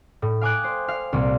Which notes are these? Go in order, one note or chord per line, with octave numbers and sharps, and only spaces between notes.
A2
F5 G5 G#5 D6 D#6 F#6
C5
F5
C2 A#2 G3